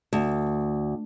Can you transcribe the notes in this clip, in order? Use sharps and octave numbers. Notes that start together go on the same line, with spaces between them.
D2